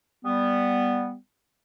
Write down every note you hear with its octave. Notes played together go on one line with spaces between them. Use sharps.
G3 B3